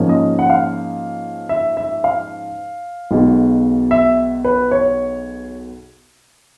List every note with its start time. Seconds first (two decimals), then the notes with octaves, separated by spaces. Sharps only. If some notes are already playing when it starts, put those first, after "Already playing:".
Already playing: G#2 F3 A#3 C#4
0.09 D#5
0.39 F#5
0.50 F5
1.49 E5
1.77 E5
2.04 F5
3.11 B1 B2 G#3
3.91 E5
4.45 B4
4.71 C#5